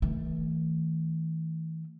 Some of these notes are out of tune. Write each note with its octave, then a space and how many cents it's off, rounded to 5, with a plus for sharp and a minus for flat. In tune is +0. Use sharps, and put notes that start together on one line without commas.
E3 -40 A3 +15